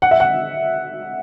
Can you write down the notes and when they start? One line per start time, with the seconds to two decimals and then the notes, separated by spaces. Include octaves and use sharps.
0.02 F#5
0.11 E5
0.20 F#5